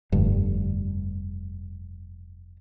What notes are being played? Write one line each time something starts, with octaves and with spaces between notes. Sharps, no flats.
F1 G2 D3